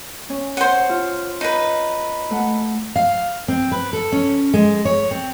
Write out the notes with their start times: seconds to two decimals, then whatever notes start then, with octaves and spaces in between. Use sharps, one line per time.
0.29 C#4
0.57 C5 C#5 F#5
0.89 F4
1.41 D#4 B4
2.31 A3 F#5
2.96 F5
3.48 C4
3.72 B4
3.93 A4
4.12 C#4
4.54 G#3
4.85 C#5
5.11 C4